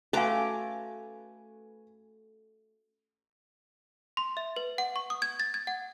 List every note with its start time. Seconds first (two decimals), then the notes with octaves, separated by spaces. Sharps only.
0.13 A3 C#4 F#4 B4 F5 G#5 A#5 D6
4.17 C6
4.37 E5
4.56 B4
4.78 F#5
4.96 C#6
5.10 D#6
5.22 G#6
5.40 A6
5.54 G#6
5.67 F#5